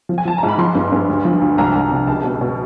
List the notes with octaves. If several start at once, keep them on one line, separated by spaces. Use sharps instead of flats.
F3
G#5
F3 A5
G#2 A#5
B5
F3 C6
G2
G2
D2
F3
D2
C2 A#5
C2
C3
C#2 A5
B2
B2